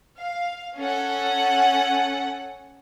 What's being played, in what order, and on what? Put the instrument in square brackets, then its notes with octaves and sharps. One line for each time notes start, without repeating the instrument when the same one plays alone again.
[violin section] F5
C#4 A4 F#5